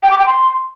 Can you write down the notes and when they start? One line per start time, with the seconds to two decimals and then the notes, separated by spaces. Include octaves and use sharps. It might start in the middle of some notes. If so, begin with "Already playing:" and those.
0.02 G5
0.10 D6
0.18 G5
0.26 C6